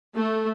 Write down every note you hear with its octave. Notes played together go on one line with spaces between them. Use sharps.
A3